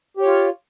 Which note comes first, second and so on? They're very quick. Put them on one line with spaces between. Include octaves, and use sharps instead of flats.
G4 C#5 F4